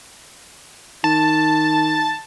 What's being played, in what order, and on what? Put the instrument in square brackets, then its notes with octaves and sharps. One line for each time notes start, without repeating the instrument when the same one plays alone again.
[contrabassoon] D#3 [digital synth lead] A5